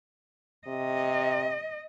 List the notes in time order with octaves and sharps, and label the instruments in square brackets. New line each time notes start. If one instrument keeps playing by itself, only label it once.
[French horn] C3 [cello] D#5